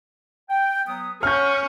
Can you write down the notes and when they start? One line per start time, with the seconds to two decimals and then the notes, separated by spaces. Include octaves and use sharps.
0.50 G5
0.87 F#3 B3 D#6
1.23 C#4 C#5 F#5 C#6 F6 G6